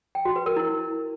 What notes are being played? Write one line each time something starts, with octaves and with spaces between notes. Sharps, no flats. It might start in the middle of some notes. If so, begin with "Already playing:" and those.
G5
F#4
B4
A#4
E4